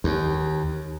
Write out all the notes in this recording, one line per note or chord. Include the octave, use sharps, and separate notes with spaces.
D#2